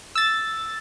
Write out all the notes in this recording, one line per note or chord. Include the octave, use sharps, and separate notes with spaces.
E6 A6